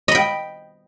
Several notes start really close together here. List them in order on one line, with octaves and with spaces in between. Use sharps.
D#5 B5 G5